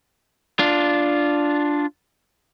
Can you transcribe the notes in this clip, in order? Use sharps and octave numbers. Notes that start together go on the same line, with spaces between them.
D4 F4